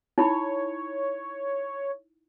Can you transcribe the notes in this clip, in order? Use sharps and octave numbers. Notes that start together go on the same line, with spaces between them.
D#4 E4 C#5 B5